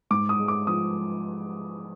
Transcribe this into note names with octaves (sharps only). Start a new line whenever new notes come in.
G#2 D6
D#6
G#3
D6
F3 D#6